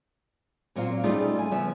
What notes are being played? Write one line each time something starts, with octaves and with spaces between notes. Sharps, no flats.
A#2 F#3 C4 F4 F5
G3 A3 C#4 D#4 F4 G#4
G#5
C#3 F3 B3 E5